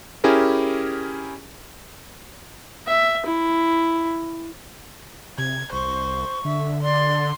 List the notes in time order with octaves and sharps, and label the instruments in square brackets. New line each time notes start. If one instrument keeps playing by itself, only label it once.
[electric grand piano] C#4 E4 G4 G#4 A#4
[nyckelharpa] E5
E4
[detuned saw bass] C3 [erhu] G#6
[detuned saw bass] C2 [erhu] C5 [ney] C#6
[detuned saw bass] D3 [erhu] E5
[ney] D5 [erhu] C6